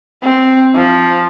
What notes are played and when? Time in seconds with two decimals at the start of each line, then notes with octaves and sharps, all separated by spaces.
0.23 C4
0.75 F3